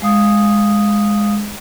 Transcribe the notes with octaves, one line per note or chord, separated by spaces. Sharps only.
G#3 F5 D#6